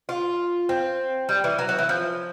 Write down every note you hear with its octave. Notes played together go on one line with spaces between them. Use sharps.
F4
C4
G3
E3
F#3
F#3
E3
F3